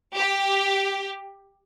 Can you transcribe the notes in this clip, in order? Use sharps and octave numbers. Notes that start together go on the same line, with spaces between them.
G4